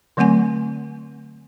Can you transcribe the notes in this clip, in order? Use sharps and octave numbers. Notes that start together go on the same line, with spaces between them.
D3 F#3 A3 C4 F#5 G#5